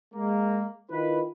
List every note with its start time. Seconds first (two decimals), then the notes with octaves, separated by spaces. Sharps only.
0.14 G#3 A#3
0.91 D#3 E4 F4 B4